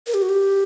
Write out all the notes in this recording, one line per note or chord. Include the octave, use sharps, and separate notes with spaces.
A#4
G4
F#4
G4